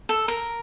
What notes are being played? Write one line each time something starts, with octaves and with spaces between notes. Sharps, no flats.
A4
A#4